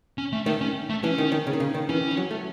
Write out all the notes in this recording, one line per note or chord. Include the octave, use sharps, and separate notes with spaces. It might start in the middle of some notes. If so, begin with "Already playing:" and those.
C#4
A3
D#3 A3
C#4
A3
E3 C#4
D#3
D#3
C#3
D#3
C#3
D#3
E3 C#4
E3
F#3
A3